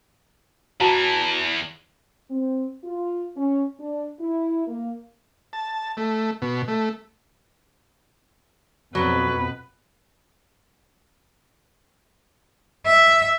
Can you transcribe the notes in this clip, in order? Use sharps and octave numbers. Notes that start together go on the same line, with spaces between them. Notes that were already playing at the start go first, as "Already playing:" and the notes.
E2 E3 F#4 A5 A#5
C4
F4
C#4
D4
E4
A#3
A5
A3
B2
A3
F2 B2 F#3 B4
E5